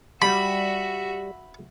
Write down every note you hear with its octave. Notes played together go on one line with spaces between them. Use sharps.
G3 F#4 E5 B5